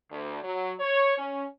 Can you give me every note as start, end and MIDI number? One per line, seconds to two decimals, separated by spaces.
0.11 0.40 38
0.43 0.74 54
0.79 1.17 73
1.18 1.44 61